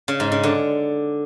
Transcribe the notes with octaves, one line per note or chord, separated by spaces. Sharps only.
C#3
G#2
C#3
D3